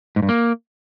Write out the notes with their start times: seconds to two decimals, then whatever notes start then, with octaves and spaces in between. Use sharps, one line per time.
0.16 G#2
0.22 G2
0.29 A#3